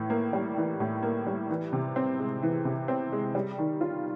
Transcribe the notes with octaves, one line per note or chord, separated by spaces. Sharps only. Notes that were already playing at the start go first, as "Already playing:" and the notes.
Already playing: A2 E3
A#3
G3
E3
A2
A#3
G3
E3
C3
C4
G#3
E3
C3
C4
G#3
G3
D#3
F4